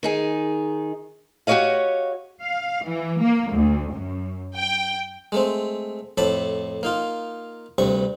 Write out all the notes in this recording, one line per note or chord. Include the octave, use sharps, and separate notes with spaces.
D#3 D#4 G#4
F#4 G4 B4 C#5 D#5 F5
F5
E3
A#3
D2
F#2
G5
G#3 A3 C4
F2 A2 A5 B5 D6
A#3 D#4 F4
D2 G2 C3 C#6